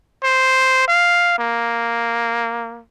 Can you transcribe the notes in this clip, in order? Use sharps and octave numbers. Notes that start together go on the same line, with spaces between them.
C5
F5
A#3